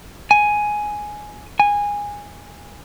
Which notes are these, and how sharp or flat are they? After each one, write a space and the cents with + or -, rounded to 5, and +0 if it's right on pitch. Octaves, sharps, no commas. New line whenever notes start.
G#5 +5
G#5 -15